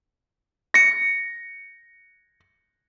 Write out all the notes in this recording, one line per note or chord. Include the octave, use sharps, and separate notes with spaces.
A#6 C#7